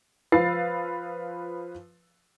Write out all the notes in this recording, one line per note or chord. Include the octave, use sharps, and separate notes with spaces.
F3 B4 F5 E6 A6 C7